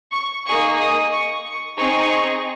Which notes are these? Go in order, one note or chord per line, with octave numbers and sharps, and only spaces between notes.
C#6
A#3 D#4 G#4 C#6
D#6
C#6
C#6
C4 D#4 G#4 C#6